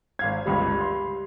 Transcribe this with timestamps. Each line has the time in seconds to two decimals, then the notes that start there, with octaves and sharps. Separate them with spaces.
0.19 G#1 F5 G#6
0.46 G1 C#2 G3 G4 B5
0.81 C6